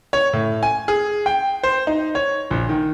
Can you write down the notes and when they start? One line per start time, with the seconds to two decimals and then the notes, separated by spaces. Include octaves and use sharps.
0.13 C#5
0.33 A2
0.63 G#5
0.88 G#4
1.26 G5
1.63 C5
1.87 D#4
2.15 C#5
2.51 A#1
2.69 D#3